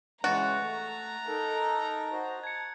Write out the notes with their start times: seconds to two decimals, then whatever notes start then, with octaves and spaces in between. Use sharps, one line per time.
0.24 C#3 E3 G#3 F#4 A#5 F#6 A6
0.61 A3
1.28 D#4 A4 A#4
2.12 F#4 C5 D#5
2.43 A5 G#6 C#7